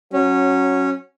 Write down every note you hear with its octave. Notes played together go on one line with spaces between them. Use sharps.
F#3 C#4